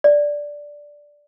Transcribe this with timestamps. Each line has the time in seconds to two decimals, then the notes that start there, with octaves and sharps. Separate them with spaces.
0.04 D5